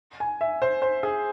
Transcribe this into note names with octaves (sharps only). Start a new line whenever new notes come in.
G#5
E5
C5
C5
G#4